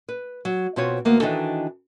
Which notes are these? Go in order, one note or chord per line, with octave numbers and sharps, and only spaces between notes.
B4
F#3
B2 C4 F4 B4 C#5
D2 A#3 B3
D#3 E3 D4 D#4 F#4 A4